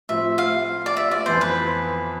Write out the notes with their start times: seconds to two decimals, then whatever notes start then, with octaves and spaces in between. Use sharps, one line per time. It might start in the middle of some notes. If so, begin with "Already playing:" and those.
0.09 A2 F3 C4 E5
0.38 F5
0.86 D5
0.97 E5
1.11 D5
1.26 F2 E3 B3 C5
1.41 B4